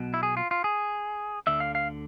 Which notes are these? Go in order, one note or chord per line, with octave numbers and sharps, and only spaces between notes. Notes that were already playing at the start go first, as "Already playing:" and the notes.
Already playing: B1 B2
E4
G#4
F4
F4
G#4
D2 D3 E5
F5
F5